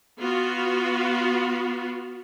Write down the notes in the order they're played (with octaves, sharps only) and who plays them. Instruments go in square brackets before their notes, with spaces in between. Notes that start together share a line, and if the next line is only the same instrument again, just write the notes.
[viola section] B3 F4 F#4